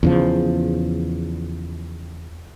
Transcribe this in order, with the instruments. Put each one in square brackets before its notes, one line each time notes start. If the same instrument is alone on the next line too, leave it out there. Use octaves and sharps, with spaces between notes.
[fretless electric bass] E2 C#3 F3